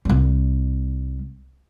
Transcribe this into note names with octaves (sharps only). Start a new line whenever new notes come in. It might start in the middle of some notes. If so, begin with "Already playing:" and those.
C2 G3